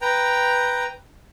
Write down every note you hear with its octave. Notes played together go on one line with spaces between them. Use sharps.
B4 G5 A#5